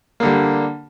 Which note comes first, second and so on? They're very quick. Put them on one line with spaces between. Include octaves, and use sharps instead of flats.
A#3 D3 G3